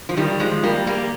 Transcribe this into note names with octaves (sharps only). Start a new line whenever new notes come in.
F3
D#3 G3
F3 G#3
G3 A#3
G3 A#3